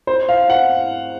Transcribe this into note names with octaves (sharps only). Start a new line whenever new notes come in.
C5
F5
F#5